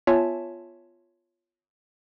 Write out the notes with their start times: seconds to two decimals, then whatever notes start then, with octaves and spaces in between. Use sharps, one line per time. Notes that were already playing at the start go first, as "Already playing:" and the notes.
0.07 B3 F4 C#5 E5 G#5 A5